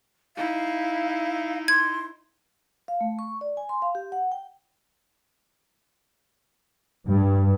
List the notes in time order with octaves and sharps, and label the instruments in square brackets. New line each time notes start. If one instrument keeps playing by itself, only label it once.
[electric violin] D#4 E4 [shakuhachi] F5
[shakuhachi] C6 [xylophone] G#6
[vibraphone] F5
A3
C#6
D5
G#5
C6
F5
G4
F#5
G5
[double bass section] G2